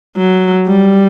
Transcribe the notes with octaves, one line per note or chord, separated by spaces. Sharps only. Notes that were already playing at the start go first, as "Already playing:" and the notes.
F#3
G3